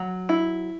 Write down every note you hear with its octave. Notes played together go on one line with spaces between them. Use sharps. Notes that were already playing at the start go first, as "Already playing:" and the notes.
Already playing: F#3
E4